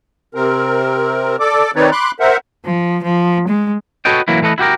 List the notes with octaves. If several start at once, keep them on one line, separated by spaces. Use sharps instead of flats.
C3 C4 A#4
A4 D5 D6
D#3 C4 D#4 B4 C#5 D5
B5 C6 D6 F#6
A#4 C5 E5 F#5
F3
F3
G#3
F#4 A4 B4 C#5 D#5 G5
E3 F#3 A#3 E4
E3 A3 A4 B4 D#5
E4 F#4 G4 A#4